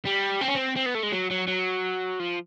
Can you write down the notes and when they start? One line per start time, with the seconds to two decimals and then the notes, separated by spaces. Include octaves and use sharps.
0.05 G3
0.41 C4
0.48 C#4
0.55 C4
0.76 C4
0.86 B3
0.95 A3
1.03 G#3
1.12 F#3
1.31 F#3
1.48 F#3
2.20 F3